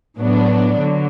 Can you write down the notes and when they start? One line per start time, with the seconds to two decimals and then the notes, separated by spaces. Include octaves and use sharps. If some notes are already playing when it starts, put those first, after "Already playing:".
0.19 A2 F#3 B3 D4
0.78 D3 F#3